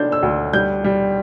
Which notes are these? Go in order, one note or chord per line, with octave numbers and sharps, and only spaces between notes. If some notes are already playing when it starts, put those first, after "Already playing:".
Already playing: A3 D4 G6 A6
E6
D2
G3 G6
G3